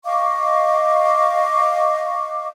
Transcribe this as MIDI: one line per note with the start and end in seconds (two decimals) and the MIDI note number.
0.04 2.47 75
0.04 2.47 77
0.04 2.47 85
0.04 2.47 86